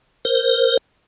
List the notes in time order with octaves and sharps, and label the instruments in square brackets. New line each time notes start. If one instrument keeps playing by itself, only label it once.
[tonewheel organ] A#4 C5